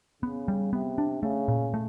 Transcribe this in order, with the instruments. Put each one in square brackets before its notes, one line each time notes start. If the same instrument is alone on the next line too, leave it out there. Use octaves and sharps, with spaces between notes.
[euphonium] C#3 [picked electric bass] B3
[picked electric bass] G3
[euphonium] C3 [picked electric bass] B3
[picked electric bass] D4
[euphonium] C#3 [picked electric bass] A3
[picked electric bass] A#2
A3